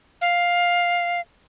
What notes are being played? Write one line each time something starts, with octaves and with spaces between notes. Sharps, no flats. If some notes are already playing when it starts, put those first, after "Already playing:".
F5